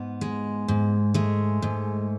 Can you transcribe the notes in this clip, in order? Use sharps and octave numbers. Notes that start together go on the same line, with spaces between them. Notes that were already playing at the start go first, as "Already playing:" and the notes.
Already playing: G#2 B3
G#3
G#2
G#3 A3
G#2